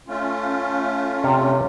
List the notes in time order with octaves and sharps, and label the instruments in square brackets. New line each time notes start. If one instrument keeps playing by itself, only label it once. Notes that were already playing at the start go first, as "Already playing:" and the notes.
[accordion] A3 C#4 F4
[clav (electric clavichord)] C3 C#5